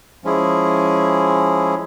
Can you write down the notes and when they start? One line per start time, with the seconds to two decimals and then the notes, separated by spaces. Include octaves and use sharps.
0.24 F3 G#3 C#4 E4 G#4